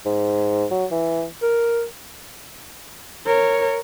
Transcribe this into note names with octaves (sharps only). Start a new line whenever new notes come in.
G#2
F#3
E3
A#4
A#4 C#5